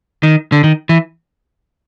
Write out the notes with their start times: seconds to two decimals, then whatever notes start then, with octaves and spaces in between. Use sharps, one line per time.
0.23 D#3
0.52 D3
0.64 D#3
0.89 E3